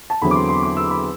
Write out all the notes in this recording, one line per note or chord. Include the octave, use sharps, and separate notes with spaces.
A5
E2 D3 F#3 C4 B5
D6
C6
C6
D6
E6
B5